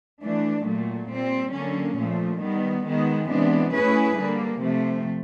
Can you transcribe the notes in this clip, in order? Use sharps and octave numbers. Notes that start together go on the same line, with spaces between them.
E3 A3 D4
A#2 F#3 A3
A#2 G3 C4
D3 F#3 A#3 C#4
A#2 F3 A3
D#3 G3 B3
D#3 G#3 B3
C3 E3 G#3 B3 D4
A3 C#4 E4 G#4 B4
D3 G3 A#3
C3 F3 A3